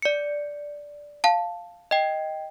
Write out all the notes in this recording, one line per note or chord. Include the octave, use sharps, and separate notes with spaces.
D5 C#7
F5 A5
D#5 G5